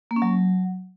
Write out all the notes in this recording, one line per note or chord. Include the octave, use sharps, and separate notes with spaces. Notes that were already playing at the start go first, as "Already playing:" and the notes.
A#3
C#4
F#3